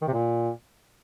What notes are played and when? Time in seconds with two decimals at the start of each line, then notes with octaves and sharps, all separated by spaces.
0.02 D#3
0.08 C3
0.13 A#2